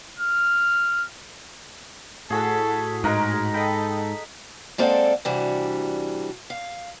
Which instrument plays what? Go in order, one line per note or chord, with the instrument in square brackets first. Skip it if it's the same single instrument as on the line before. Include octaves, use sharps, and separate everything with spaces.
[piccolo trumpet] F6
[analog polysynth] A2 F#4 B6 [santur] G#4 [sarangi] A4
[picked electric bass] G#2 [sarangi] G#3 [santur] D#4 A#4 F#5
[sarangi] A4 [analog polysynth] D#5 G5 [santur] B5
[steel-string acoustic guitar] G#3 A#3 C4 A4 D5 F#5
C3 E3 G3 D4 F#4
F5